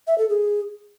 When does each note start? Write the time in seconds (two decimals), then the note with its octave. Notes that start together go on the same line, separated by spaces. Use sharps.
0.07 E5
0.18 A4
0.29 G#4